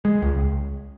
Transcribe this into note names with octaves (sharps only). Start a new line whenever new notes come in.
G#3
C#2